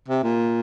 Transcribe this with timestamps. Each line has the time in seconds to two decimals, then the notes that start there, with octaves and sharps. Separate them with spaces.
0.08 C3
0.23 A#2